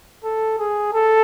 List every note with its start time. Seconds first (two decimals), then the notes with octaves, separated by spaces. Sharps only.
0.24 A4
0.58 G#4
0.93 A4